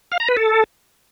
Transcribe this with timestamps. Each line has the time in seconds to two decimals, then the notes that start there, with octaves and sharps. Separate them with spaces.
0.12 F5
0.20 A#5
0.28 B4
0.37 A4